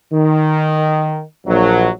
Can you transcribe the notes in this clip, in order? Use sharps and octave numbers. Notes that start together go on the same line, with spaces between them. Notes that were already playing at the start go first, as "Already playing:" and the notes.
D#3
A#1 F#3